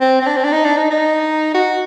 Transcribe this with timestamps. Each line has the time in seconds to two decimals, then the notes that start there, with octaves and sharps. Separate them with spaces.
0.01 C4
0.21 C4
0.26 D4
0.36 C4
0.44 D4
0.52 D#4
0.65 D4
0.77 D#4
0.90 D#4
1.54 F#4